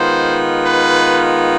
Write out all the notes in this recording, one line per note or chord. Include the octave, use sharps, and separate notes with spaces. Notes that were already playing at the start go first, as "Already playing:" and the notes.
Already playing: D#3 G#3 B3 F4 C5
B4